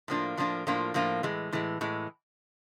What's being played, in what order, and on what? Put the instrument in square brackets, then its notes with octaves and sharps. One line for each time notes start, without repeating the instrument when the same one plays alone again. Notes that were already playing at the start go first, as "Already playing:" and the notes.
[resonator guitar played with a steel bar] A2 F3 A#3 D4 F4
A2 F3 A#3 D4 F4
A2 F3 A#3 D4 F4
A2 F3 A#3 D4 F4
A2 E3 G#3
A2 E3 G#3
A2 E3 G#3